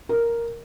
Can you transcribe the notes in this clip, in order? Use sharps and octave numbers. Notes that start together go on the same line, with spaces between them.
A#4